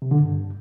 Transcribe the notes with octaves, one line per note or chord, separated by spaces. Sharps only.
C3
D3
G2